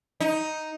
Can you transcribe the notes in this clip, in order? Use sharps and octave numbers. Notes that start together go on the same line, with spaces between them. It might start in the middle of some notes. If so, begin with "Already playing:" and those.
D#4